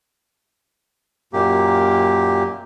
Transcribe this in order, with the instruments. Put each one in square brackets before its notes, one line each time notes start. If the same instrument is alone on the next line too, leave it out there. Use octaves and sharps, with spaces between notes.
[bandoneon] F#2 A#2 A#3 G4